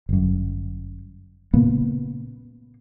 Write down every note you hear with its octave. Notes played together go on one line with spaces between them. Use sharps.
G1 F#2
A#2 C#3 A#3 B3